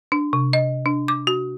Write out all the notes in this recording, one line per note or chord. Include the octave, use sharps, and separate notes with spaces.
D4
C3
D#5
D4
D6
F#4